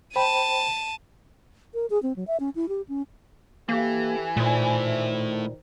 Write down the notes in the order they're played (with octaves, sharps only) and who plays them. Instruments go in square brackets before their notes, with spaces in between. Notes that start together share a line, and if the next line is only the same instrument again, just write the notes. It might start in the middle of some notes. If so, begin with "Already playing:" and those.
[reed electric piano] C5 G5 B5 [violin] A5 D#7
[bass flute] A#4
G#4
C4
F#3
E5
C#4
E4
G4
C#4
[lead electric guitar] E3 [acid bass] A#3 [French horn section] G4 A4
[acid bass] A#2 [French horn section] D#3 C5 [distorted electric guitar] A3 E4